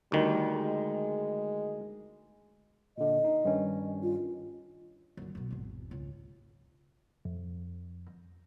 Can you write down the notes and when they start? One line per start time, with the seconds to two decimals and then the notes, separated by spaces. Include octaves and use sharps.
0.12 D2 D#3 G3
0.52 G#3
2.98 A#2 D3 D#5
3.24 D#4
3.45 G2 D#3 C#4
4.03 F4
5.17 F#2 D3
5.35 F#2 B2
5.51 G#1 E2
5.91 C#2
7.25 F2